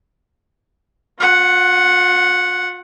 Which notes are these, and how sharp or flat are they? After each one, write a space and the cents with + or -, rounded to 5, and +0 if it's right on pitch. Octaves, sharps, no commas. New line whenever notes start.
F4 +40 F#5 +0